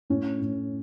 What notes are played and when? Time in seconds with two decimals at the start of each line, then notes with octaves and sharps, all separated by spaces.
0.10 A2 C#4
0.41 A2